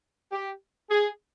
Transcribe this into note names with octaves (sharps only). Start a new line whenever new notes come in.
G4
G#4